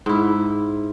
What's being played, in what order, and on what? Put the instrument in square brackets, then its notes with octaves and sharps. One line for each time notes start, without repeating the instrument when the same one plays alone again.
[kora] G#2 E4